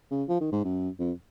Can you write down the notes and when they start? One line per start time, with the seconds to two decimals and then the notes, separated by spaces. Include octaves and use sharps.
0.11 C#3
0.29 F3
0.40 D#3
0.52 G#2
0.64 F#2
0.99 F2